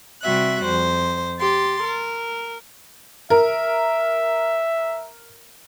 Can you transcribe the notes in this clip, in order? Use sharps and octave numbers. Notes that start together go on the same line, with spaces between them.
C3 G3 F#4 E5 F#6
F2 C5
G4 C6 A6
A#4
A#4 E5